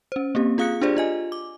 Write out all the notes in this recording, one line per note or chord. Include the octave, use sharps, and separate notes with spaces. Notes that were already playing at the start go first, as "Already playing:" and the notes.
C#4 C5
A#3 C4 G4
F4 G#4 F5 D#6 F#6 C#7
D4 F4 G4 G#4 C5 D5
F4 D#5 G#5
D6